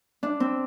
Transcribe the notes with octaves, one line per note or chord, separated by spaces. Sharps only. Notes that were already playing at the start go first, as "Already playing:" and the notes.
D4
C4